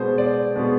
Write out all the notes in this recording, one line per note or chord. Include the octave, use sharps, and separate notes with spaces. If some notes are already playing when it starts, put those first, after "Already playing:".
Already playing: B2 G#3 B3 C5
D5
B2 G#3 B3